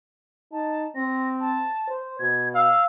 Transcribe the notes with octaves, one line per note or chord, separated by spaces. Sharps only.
D#4 A5
C4 A#6
A5
C5
B2 G#6
F5 E6